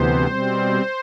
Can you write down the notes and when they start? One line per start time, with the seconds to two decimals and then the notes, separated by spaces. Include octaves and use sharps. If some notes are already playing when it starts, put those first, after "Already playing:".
Already playing: D2 C3 E3 B3 C5
0.26 B2 G3 C4